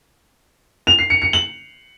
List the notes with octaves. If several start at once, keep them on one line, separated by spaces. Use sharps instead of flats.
F7
C7
C#7
C#7
F#7